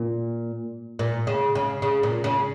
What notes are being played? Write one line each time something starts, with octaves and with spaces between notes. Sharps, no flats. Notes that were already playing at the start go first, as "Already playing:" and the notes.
Already playing: A#2
A#2
C#3
C#3
C#3
A#2
C#3